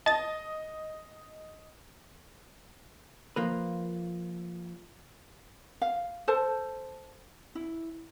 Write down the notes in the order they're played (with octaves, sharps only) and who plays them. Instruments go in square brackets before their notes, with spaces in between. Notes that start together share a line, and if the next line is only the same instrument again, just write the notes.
[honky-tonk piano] D#5 [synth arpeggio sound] A5 A6
[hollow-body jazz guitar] F3 A#3 B4
[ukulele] F5
A4 C5 A5
E4